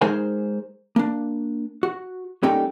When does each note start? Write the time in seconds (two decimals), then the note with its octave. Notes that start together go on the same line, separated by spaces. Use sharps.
0.01 G#3 D#4 G#4 A#4 C5 G#5
0.96 A#3 D4
1.83 F#4
2.43 G3 A#3 C#4 D#4 A4 G5